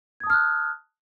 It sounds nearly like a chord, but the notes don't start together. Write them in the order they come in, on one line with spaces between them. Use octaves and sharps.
G#6 D#6 A5 F6 F#6